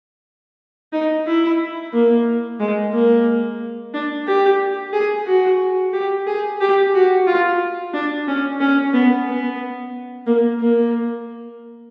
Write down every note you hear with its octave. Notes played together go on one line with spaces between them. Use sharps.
D#4
E4
A#3
G#3
A#3
D4
G4
G#4
F#4
G4
G#4
G4
F#4
F4
D4
C#4
C#4
B3
B3
A#3
A#3